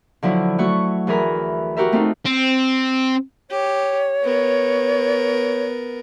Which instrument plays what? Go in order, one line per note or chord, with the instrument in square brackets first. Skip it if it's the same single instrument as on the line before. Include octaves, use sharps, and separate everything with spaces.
[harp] D3 F3 F#3 E4
F#3 A3 F#4 C#6
D2 E3 G#4 A#4 B5
F#4 G4 A#4 E5
A3 C4 D#4 F4
[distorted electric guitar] C4
[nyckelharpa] G4 [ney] C#5
[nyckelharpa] B3 A#4